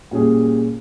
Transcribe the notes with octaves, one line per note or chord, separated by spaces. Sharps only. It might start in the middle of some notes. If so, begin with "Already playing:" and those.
A#2 G3 C#4 G#4